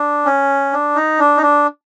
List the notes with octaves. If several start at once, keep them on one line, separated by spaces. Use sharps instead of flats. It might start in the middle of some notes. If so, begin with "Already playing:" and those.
Already playing: D4
C#4
D4
D#4
D4
D#4
D4